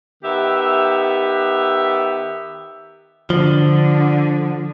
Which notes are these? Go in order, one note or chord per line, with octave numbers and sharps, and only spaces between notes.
D#3 B3 G4 E5
D3 F3